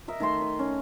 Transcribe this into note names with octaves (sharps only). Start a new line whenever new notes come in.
A#4 D#5 E5
D#3 A3 E5 C6
D#5
C#4